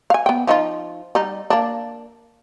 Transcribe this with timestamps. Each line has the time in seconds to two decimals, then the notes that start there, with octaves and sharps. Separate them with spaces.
0.10 F5 G#5
0.26 B3 G5
0.47 F3 D#4 F4
1.15 G3 D#4
1.50 A#3 D4